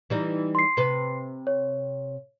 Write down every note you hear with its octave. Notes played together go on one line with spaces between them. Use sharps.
E3 G3 D#4
C6 C7
C3 B4
C#5